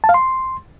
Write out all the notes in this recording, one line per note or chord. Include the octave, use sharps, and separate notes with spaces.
A5
F5
C6